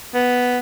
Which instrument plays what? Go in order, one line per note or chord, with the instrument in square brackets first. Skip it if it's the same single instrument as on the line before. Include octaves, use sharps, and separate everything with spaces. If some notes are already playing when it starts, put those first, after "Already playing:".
[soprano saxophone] B3